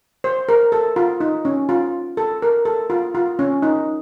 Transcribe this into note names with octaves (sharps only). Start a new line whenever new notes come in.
C5
A#4
A4
F4
D#4
C#4
F4
A4
A#4
A4
F4
F4
C#4
D#4